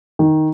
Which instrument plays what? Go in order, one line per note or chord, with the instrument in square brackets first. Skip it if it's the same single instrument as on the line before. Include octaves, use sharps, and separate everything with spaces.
[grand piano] D#3